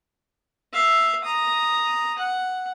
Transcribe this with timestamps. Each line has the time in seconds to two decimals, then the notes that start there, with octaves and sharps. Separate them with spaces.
0.73 E5 F5
1.24 A#5 D#6
2.18 F#5